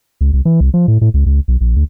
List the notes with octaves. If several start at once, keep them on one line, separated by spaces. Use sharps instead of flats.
C#2
C2
E3
C2
F3
A2
A2
C#2
C#2
B1
A#1
D2